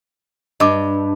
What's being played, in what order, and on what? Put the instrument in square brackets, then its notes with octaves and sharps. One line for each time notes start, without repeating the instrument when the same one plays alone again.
[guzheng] G2 [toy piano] D#5 D6